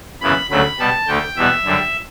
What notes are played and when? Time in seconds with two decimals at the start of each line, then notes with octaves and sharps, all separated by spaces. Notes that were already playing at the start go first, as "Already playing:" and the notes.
0.21 F#2 C#3 E3 B3 B5
0.50 D2 C#3 F#3 A3 B5
0.79 B2 G3 B3 A5
1.07 D2 D3 A3 G5
1.37 E2 B2 G3 B3 E5
1.64 F#2 D3 G3